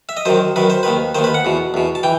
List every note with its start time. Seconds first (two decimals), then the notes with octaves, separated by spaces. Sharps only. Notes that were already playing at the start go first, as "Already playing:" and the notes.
0.09 E5
0.17 D#5
0.25 F#2 D#3 C5
0.56 F#2 D#3 B4
0.70 C5
0.83 D#2 D#3 B4
1.15 D#2 D#3 C5
1.24 B4
1.34 F#5
1.45 E2 B2
1.74 E2 B2
1.95 A5
2.03 E3 G5